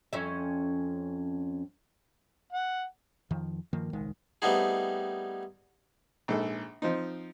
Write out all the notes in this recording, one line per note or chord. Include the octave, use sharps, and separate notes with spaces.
F2 C#4 E5
F#5
F2 D#3 F3
G2 D#3 F3 A#3
D#1 C2 D#3 G#3
G3 A3 B3 C4 D#4 G#4
A#1 G#2 A4
F3 C4 D#4